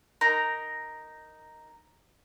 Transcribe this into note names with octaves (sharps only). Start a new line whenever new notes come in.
D#4 A#4 A#5